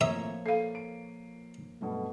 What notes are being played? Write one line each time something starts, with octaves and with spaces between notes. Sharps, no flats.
A2 F3 A#3 C4 C#5 E5 A#5 D#6
A#3 A4 F5 C7 D#7
D7
B1 G2 B2 A3